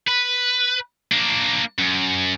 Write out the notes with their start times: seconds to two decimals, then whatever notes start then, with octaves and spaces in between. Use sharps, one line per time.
0.08 B4
1.12 A#3 D4
1.79 F#2